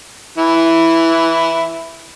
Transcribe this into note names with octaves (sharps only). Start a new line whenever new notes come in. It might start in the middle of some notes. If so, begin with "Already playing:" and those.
E3 E4